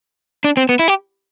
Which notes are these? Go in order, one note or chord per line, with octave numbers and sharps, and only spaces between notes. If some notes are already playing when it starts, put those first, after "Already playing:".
D4
C4
B3
E4
G4